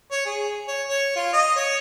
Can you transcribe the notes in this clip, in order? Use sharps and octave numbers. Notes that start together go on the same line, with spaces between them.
C#5
G#4
C#5
C#5
F4
D#5
C#5